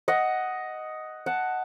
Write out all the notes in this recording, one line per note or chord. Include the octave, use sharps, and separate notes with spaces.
D#5 F#5
F#5 A5